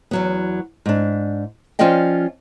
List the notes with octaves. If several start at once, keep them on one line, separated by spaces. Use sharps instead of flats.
E2 F#3 B3
G#2 D4
F3 C#4 F4 D5 D#5 G5